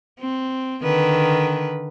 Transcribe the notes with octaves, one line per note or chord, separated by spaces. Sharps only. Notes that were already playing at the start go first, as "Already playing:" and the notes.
C4
D3 D#3 B4